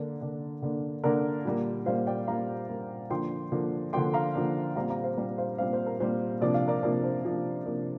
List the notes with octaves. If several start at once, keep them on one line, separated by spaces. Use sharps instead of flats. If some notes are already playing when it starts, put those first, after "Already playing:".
Already playing: D3 A#3 D4 A#4 D5
D3 A#3 D4
D3 A#3 D4
D3 A#3 D4 A#4 D5
A#2 G3 A#3
A#2 G3 A#3 C5 F5
D5 G5
A#2 G3 A#3 F5 A#5
A#2 G3 A#3
D3 F3 A#3 D4 G5 C6
D3 F3 A#3 D4
D3 F3 A#3 D4 G5 C6
F5 A#5
D3 F3 A#3 D4
A#2 G3 C4 F5 A#5
F5 A#5
C5 F5
A#2 G3 C4 C5
C5 F5
A#2 G3 C4 C5 F5
C5
A#4
A#2 G3 C4 C5
C3 F3 A#3 D4 D5
F5
A#4 D5
C3 F3 A#3 D4 A#4 D5
C5
C3 F3 A#3 D4
C3 F3 A#3 D4 A#4